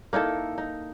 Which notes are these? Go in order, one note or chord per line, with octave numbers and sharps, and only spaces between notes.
A#3 D#4 E4 A4
D#4